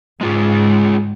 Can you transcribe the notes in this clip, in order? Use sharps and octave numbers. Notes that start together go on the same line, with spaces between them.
G#2 G#3 F4 G#4